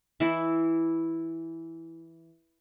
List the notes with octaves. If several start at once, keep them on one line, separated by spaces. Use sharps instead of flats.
E3 E4